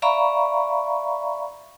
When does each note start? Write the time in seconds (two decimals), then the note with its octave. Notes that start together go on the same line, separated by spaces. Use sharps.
0.02 D5 E5 F5 A#5 B5 C#6